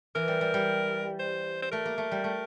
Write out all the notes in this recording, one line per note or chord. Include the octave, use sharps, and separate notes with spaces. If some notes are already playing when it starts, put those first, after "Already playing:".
E3 A#4
G3
G3
G3
C5
C5
A3 A#4
A#3
A3
G3
A3